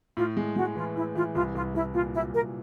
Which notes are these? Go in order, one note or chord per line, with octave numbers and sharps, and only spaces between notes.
A2 F4
G#3
G#3 F#4
E3 F4
A2 E4
E3 F4
C2 F4
C2 F4
C2 E4
A#2 F4
F#3 E4
C2 A#4